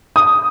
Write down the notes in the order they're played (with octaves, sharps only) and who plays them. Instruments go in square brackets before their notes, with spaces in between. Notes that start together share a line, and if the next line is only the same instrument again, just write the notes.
[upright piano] D#6